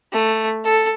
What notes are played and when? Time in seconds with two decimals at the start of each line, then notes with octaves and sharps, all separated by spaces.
0.13 A3
0.65 A4